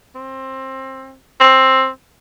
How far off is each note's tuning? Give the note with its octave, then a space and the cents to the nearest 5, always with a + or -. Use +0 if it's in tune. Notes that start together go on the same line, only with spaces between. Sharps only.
C4 +20
C4 +15